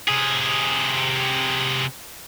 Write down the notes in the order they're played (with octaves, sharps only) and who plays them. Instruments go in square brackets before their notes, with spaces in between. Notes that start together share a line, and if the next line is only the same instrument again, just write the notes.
[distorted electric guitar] C3 G#4